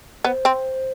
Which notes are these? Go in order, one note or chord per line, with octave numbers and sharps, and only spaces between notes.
B3 C5
C4